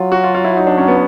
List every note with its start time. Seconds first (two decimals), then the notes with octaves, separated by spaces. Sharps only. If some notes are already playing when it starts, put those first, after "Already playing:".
Already playing: F#3 F4
0.12 F#4
0.24 F4
0.35 F4
0.44 E4
0.56 D#4
0.67 D4
0.77 C#4
0.88 B3